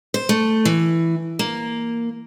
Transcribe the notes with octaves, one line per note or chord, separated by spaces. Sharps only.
C5
A3
E3
A#3